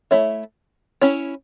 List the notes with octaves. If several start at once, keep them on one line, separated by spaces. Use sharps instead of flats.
A3 E4 C#5 E5
C#4 E4 C#5